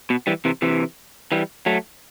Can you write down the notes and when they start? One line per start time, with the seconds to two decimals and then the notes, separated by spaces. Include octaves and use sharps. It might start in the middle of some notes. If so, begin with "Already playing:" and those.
0.10 B2
0.27 E3 G3
0.45 C3 E3
0.62 C3 E3
1.32 E3 G3
1.66 F#3 A3